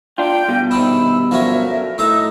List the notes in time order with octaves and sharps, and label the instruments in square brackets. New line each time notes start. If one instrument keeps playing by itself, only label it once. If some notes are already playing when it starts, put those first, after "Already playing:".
[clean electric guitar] D4 F4 [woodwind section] G5
[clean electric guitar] G2 B2
[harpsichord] C3 D#3 D4 [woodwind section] B5 E6
[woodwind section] D2 A#4 [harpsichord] F3 F#3 C#4 [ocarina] E5
[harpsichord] A2 A3 A#5 [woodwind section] D#4 [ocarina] E6